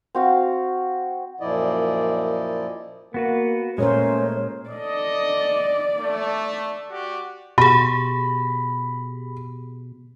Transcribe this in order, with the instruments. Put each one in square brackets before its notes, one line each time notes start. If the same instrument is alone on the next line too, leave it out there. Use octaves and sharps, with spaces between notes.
[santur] C4 F#4 F5
[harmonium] F#2 A#2 F3 E4 D5 D#5
[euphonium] A#3 [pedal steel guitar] B3 F#4 B4
[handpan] A#2 A#4 C5 [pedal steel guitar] G#3 A3 [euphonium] C#4 [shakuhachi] C#5
[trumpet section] A4 D#5 [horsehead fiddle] D5
[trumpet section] A3
F#4 G4 D5
[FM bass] B2 [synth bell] G4 G#4 [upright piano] B5